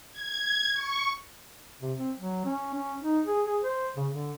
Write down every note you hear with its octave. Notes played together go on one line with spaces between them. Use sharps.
G#6
C#6
C3
C4
F#3
C#4
C#4
D#4
G#4
G#4
C5
C#3
D3